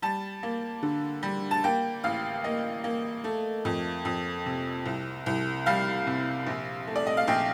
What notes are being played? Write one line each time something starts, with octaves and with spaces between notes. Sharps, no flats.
G3 A5
A#3
D3
G3
A5
A#3 G5
A1 F5
A#3 D#5
A#3
A3
F2
F2
C3
C2
C2
G3 F5
C3
A#1
A3
D5
D#5
F5
A#1 G5